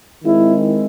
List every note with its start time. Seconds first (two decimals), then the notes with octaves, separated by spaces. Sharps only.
0.25 D#3 G#3 C4 E4